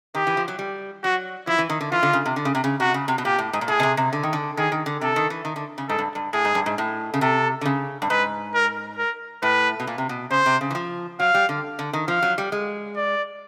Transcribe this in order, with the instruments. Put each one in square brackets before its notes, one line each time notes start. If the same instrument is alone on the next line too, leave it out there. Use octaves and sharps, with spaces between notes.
[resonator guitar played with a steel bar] D#3 [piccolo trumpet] G4
[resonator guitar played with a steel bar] E3
F3
F#3
G3
[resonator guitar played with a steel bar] F#3 [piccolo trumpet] F#4
[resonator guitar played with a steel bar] F3 [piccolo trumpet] E4
[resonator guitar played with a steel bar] E3
D#3
D3
[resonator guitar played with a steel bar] E3 [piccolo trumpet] F4
[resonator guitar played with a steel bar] D3
C#3
C3
D3
C#3
C3
C#3
[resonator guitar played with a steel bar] C3 [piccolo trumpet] F#4
[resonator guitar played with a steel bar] C#3
C3
B2
[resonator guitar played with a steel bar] A#2 [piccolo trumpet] G4
[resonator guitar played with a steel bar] A2
G#2
A#2
[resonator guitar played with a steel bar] A2 [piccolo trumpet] G#4
[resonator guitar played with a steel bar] B2
C3
C3
D3
D#3
D3
[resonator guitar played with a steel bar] D#3 [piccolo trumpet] G#4
[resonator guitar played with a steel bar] D#3
D3
[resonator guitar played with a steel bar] C3 [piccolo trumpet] A4
[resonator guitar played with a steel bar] D#3
E3
D#3
D3
C#3
[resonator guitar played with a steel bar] G#2 [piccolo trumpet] A4
[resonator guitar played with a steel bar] G2
G2
[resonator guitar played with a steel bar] A2 [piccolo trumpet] G#4
[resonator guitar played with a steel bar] G#2
G2
G#2
A2
C#3
[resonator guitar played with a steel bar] C3 [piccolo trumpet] A4
[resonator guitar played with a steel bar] D3
C#3
G2
[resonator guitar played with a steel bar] G#2 [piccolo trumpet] B4
[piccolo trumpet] A#4
A#4
[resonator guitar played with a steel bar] A2 [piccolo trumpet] B4
[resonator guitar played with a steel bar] B2
A#2
C3
B2
[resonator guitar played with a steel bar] C#3 [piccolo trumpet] C5
[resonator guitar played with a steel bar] C3
C#3
E3
F3
[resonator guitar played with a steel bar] F#3 [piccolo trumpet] F5
[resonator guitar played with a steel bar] G3
D3
D3
D#3
[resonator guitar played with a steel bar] F3 [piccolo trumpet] F5
[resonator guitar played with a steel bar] F#3
G3
G#3
[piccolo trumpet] D5